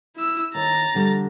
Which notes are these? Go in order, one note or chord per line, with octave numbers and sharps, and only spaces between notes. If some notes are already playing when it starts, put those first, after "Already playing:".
E4 E6
D#2 A#5 A6
F2 D3 G3